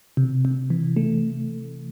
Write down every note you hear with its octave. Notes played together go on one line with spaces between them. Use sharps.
C3
C3
E3
A3